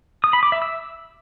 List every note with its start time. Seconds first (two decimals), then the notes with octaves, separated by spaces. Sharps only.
0.24 D#6
0.33 B5
0.43 D6
0.52 E5
0.62 E6